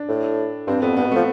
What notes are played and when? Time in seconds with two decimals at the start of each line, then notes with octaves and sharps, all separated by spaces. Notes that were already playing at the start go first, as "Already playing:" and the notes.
Already playing: D4
0.09 A2
0.67 G2 C4
0.82 F2 B3
0.97 G2 B3
1.06 B2
1.12 F3 A3